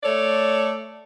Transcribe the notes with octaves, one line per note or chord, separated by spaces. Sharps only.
A3 A4 C#5 D5